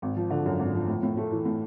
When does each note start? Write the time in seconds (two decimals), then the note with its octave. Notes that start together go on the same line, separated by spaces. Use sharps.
0.02 G#1
0.17 F3
0.30 D3
0.46 F#2
0.59 G#1
0.74 F3
0.88 A2
1.03 A2
1.17 A3
1.32 E3
1.46 A2